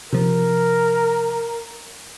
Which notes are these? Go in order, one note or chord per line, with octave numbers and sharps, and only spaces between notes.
C3 F3 A#4